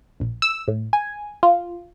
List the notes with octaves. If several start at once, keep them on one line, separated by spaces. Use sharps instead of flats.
A#1
E6
A2
G#5
F4